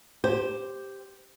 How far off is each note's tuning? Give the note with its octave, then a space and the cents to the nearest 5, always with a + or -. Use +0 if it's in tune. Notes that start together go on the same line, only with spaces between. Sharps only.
G4 +0 C5 +0